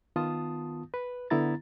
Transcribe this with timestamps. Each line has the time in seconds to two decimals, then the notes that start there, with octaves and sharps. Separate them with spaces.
0.16 D#3 B3 F4 A5 D#6
0.94 B4
1.30 D3 B3 E4 A#5 A6